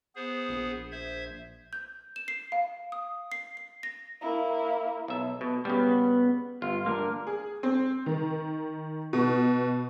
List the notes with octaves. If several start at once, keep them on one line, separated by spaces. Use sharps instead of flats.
B3 G#4 C5
A#1
C5 E5 G#6
G6
E7
C7
F5
D#6
C7
C7
A#6
A#3 E4
B1 E5
B2
C#3 G3 B3
G1 F4
A#3 D4 A#4
G#4
C4
D#3
B2